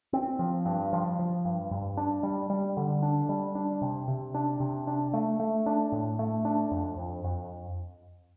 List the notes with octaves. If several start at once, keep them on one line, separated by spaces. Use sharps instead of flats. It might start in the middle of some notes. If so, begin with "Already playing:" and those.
C4
F3
G2
F3
F3
G2
G2
D4
G3
G3
D3
D4
G3
D4
C3
C3
D4
C3
D4
A3
A3
D4
A2
A3
D4
F2
F2
F2